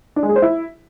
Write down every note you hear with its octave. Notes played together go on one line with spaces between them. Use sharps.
D4
G#3
G#4
C5
E4